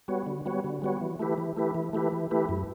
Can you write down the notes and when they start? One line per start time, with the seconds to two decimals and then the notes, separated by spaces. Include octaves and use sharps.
0.08 G3 B3 F#4 C#5
0.26 D3
0.46 G3 B3 F#4 C#5
0.64 D3
0.82 G3 B3 F#4 C#5
1.01 E3
1.19 A3 E4 G4 B4
1.38 E3
1.57 A3 E4 G4 B4
1.75 E3
1.93 A3 E4 G4 B4
2.12 E3
2.31 A3 E4 G4 B4
2.49 F#2